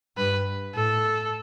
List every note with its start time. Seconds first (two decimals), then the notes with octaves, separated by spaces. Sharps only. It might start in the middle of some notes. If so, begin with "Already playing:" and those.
0.17 G2 B4
0.76 A2 A4